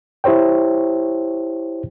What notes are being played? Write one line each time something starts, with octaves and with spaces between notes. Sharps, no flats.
E4 G4 C5 C#5 G5